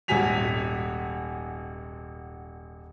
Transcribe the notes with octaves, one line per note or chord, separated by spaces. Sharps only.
D#1 G#1 F#4 G#5 B6 F7